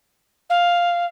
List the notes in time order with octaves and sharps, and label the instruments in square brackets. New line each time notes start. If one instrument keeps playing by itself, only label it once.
[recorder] F5